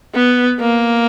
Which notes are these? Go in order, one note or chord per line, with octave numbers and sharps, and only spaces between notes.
B3
A#3